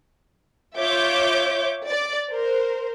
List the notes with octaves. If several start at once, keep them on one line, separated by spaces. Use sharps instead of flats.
F4 C#5 E5 D6 G6
D5
A#4 C5